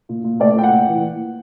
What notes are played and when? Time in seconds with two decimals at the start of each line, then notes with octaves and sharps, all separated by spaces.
0.09 A#2
0.24 A#2
0.40 A3 D5
0.56 A#2 G5
0.63 F#5
0.72 A#2
0.88 E3